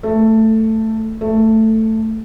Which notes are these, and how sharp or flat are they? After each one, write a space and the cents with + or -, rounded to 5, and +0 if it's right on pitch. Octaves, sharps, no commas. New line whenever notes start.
A3 +10
A3 +10